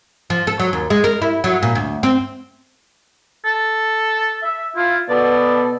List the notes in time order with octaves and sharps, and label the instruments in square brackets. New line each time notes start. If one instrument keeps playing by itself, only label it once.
[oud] F3
A4
F#3
D#2
G#3
A#4
E4
F#3
A#2
D2
C4
[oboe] A4
[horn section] E5
[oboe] E4 [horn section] F4
[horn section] B2 B3 A4 [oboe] D5